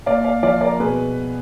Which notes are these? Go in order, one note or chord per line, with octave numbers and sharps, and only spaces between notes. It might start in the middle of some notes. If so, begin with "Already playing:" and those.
A#2 D5 F5
D5 F5
F3 D5 F5
A#4 D5
B2 G#4 B4